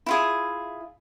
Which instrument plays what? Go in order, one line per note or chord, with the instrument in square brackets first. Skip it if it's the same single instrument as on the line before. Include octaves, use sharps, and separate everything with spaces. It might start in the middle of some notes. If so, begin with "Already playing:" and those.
[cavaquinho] E4 F4 G#4